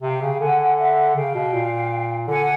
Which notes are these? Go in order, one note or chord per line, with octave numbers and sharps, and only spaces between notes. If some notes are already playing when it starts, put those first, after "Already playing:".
C3 F5 G5
C#3
D3 F#5 G#5
E5 F#5
C#3 F5 G5
B2
A#2
D3 F#5 G#5